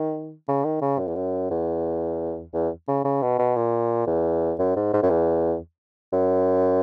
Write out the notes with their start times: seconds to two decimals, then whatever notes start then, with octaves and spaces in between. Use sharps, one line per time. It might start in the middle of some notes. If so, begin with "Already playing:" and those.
Already playing: D#3
0.48 C#3
0.65 D#3
0.81 C#3
0.99 F#2
1.07 E2
1.16 F#2
1.50 E2
2.53 E2
2.88 C#3
3.04 C#3
3.22 B2
3.39 B2
3.56 A#2
4.07 E2
4.59 F#2
4.76 G#2
4.93 G#2
5.03 F#2
5.10 E2
6.13 F#2